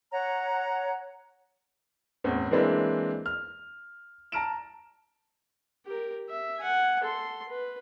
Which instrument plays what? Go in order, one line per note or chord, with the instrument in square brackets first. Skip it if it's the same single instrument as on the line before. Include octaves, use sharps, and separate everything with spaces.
[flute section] C#5 F#5 A#5
[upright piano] E2 A2 C4 C#4
E3 G#3 A#3 C4 D4 E4
F6
A5 A#5 F6 D7 E7
[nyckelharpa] G4 A#4
E5
F#5 G#5
A4 C6
B4